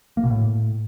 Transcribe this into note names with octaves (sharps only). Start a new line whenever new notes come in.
A#3
B2
A2